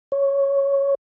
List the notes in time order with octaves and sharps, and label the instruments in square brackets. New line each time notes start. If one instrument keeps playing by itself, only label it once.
[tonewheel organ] C#5